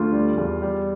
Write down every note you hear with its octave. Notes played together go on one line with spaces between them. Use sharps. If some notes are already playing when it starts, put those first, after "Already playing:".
Already playing: D2 F4
G3
E2
G3